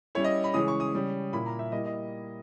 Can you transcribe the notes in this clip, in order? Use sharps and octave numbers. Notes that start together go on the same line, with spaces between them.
G3 C#4 E4 C#5
D#5
B5
C#3 E3 G#3 C#4 E4 D#6
C#6
D#6
C#3 G3 C#4
A#2 A#3 E4 B5
A#5
E5
G3 A#3 E4 D#5
D#5